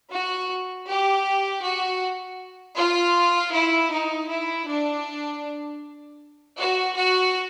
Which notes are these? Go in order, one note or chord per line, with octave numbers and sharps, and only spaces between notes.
F#4
G4
F#4
F4
E4
D#4
E4
D4
F#4
F#4